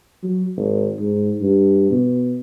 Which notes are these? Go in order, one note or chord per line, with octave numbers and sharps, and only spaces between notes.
F#3
G#1
G#2
G2
B2